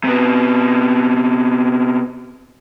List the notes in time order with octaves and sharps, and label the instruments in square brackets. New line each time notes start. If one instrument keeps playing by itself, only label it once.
[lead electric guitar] C3 B3